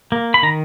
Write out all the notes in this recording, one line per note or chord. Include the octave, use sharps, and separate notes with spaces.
A#3
B5
D#3 A#5